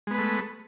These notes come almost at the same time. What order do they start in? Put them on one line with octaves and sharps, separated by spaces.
G#3 B3 B4 A3